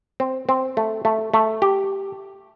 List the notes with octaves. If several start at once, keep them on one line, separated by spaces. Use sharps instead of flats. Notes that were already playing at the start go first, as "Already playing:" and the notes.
C4
C4
A3
A3
A3
G4